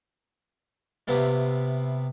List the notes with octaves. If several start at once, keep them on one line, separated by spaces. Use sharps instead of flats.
C3 B3 E4 F4